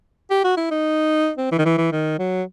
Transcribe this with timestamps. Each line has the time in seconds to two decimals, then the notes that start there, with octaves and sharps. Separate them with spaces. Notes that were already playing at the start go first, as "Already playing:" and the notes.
0.30 G4
0.44 F#4
0.57 E4
0.71 D#4
1.37 C4
1.52 E3
1.58 D#3
1.65 E3
1.78 E3
1.92 D#3
2.19 F#3